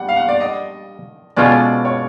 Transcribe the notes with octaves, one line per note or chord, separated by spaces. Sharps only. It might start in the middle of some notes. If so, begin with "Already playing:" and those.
Already playing: G3 F#5
F5
F#5
D5
D#5
B2 G#3 C#4 F4 A4 D5
C#5